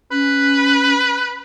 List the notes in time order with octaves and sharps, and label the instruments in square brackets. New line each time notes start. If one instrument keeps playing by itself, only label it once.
[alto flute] C#4 [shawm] B4